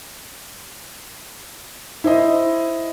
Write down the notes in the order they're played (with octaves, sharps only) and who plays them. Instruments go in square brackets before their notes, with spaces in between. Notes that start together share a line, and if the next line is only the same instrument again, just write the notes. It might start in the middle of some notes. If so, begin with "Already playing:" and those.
[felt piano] E4 C5 D#5